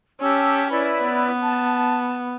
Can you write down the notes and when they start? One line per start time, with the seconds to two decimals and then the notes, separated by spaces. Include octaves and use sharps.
0.20 C#4 G4 A5 E6
0.70 E4 B4 D5
1.02 B3
1.41 A5